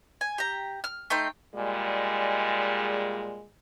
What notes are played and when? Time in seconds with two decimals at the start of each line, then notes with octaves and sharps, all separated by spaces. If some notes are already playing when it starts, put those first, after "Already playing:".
0.21 G#5
0.38 G4 A#5
0.84 F6
1.10 A3 D#4 G5 C6
1.55 A#2 G3 G#3